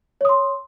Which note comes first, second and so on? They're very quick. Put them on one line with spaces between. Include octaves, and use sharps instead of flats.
C#5 D#6 C6